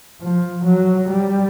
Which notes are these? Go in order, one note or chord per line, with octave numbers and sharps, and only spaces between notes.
F3
F#3
G3